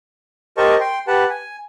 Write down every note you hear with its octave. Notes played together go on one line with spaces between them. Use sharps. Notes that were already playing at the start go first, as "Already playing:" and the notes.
G4 A#4 C5 D#5 A5 C#6
G5 C6
G4 B4 F#5 A5
G#5